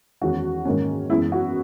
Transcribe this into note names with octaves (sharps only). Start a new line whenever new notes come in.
E2 D#3 G#3 C#4 F#4
G#2 D#3 A#3 C#4
F#2 E3 G#3 B3 E4
F#4